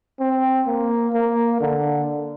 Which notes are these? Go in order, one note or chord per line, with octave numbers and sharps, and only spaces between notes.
C4
A#3
A#3
D3